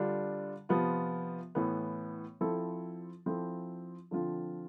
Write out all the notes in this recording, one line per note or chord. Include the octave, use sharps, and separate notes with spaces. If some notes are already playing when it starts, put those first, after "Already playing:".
Already playing: D3 G3 D4 F4
C3 F3 B3 F4
A2 E3 B3
F3 C4 E4 A4
F3 C4 E4 A4
D3 F3 C4 F4